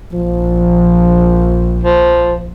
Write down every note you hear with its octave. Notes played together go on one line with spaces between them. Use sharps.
A#1 F3
F3